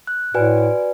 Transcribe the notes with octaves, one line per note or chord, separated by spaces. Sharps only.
F#6
A2 F#4 B4 D5 G#5